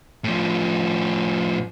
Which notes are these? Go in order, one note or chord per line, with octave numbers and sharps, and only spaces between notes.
A2 F3